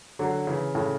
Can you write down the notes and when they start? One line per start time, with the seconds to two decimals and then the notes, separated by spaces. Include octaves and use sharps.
0.19 D3 F#3
0.47 C#3 E3
0.75 A2 C#3